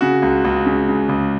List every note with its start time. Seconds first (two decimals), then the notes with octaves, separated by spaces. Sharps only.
0.01 C#3 F#4
0.22 C#2
0.45 C#2
0.66 C#3
0.88 C#3
1.09 C#2